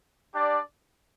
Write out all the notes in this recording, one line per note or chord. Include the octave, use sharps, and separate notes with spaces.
D4 G4 D5